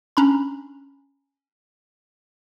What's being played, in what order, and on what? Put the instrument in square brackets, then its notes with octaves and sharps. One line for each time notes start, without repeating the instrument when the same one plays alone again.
[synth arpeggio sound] C#4 D4 A#5 B5